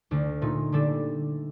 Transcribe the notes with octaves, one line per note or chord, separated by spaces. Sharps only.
D2 D3 A3
A#2 A3 D#4
D3 G3 D4 A4